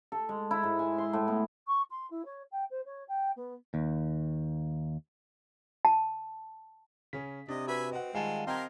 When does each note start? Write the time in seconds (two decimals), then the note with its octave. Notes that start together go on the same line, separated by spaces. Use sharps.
0.12 A4
0.29 G#3
0.51 E4
0.63 G#2
0.79 G#5
0.98 C6
1.13 A2
1.28 B3
1.67 C#6
1.90 C6
2.10 E4
2.25 C#5
2.51 G5
2.70 C5
2.85 C#5
3.08 G5
3.36 B3
3.74 D#2
5.85 A5
7.13 C#3 C#4 B6
7.48 C3 D4 D#5
7.68 F#4 B4 E5 G#5 B5
7.92 C4 D#5 F#5
8.15 D#3 G3 G#3 F4 F5 F#5 A5
8.47 C4 G4 A#4 D#5 A#5 C6 G#6